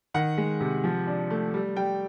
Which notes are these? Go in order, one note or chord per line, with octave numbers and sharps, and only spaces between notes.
D#3 F#5
G#3
C3
F3
D4
A3
G3
G3 G5